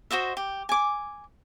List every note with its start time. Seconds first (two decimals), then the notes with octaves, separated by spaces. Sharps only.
0.11 F#4 C5 D#5 E5
0.37 G4
0.69 G#5 D6